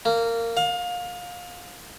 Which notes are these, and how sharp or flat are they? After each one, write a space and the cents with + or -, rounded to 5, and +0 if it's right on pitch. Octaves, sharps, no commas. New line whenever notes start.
A#3 -20
F5 +25